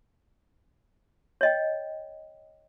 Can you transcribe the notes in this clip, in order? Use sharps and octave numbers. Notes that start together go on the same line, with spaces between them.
C#5 D#5 G5